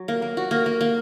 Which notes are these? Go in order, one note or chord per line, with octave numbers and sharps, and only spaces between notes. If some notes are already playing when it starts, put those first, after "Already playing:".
Already playing: F#3
A#3
A#3
F#4
A#3
A#3
A#3